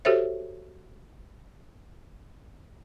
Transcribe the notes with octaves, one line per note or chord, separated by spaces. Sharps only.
F#4 G4 A4 C5 C#5 E5